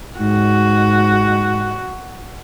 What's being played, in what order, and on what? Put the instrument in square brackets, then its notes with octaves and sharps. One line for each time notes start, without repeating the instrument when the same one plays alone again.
[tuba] G#2 [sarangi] F#4